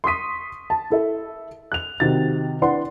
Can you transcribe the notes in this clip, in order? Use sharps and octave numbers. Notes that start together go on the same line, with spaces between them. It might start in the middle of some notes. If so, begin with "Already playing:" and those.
C6 C#6 D#6 B6 D#7
A5
E4 A4 E5
F#6 F7
C3 D#3 F#4 A6
D4 E4 B4 F#5 C6